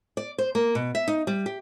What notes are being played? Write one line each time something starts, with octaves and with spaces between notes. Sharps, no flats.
D5
C5
A#3
B2
E5
D#4
G3
G4